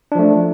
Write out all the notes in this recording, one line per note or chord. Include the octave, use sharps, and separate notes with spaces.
F3 A3 D4